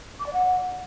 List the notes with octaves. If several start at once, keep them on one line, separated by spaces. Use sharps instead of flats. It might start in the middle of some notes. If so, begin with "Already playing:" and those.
D6
D5
F#5